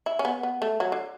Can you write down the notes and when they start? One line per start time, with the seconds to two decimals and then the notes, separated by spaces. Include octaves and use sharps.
0.06 E4
0.19 C#4
0.25 B3
0.43 B3
0.62 A3
0.80 F#3
0.92 D3